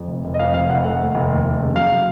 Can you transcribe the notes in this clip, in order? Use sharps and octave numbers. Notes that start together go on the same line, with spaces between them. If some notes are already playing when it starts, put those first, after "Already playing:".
Already playing: F2
F1
F1
D#5
F2 F5
F1 F5
F1 F#5
A3 F#5
D#2
F1
D#2
F1
C#3
F#3 F5